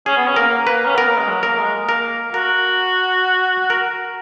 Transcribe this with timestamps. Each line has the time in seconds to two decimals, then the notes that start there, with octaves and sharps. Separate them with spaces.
0.06 C#4 G#4
0.17 B3
0.27 C#4
0.36 A#3 A#4
0.67 A#3 B4
0.85 C#4
0.96 B3 A#4
1.07 A#3
1.17 G#3
1.28 F#3
1.43 A#3 A#4
1.58 G#3
1.88 A#3 A#4
2.34 F#4 A#4
3.70 A#4